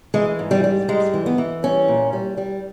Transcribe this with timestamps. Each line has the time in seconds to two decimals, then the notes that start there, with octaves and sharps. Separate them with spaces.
0.14 E3 G#3
0.39 G#2
0.51 G3
0.64 G3
0.88 G#2 G#3
1.14 E3
1.26 B3
1.38 E3
1.63 G3 C#4
1.88 A#2
2.13 G3
2.37 G3